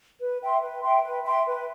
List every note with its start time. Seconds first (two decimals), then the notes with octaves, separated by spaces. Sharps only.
0.21 B4
0.42 E5 G5 C6
0.62 B4
0.82 E5 G5 C6
1.03 B4
1.25 E5 G5 C6
1.46 B4